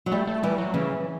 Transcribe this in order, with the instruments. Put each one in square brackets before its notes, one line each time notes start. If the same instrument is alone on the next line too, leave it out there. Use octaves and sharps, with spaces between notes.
[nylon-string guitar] F#3
[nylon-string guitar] G3 [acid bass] A3
[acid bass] A3
[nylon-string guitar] E3 [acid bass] G3
[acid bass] F#3
[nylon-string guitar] C#3 [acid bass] E3